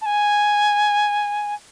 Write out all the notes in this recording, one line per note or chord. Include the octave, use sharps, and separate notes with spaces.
A5
G#5